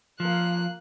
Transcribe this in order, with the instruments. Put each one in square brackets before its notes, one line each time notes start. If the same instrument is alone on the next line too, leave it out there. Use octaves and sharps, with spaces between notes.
[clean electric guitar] F3 [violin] A#3 F#6